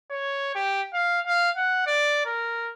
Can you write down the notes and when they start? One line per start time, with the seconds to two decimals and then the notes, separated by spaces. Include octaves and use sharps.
0.11 C#5
0.55 G4
0.94 F5
1.26 F5
1.57 F#5
1.87 D5
2.26 A#4